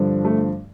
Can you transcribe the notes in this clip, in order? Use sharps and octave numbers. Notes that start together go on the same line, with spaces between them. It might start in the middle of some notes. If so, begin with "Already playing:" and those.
Already playing: G2 D3 F3
A3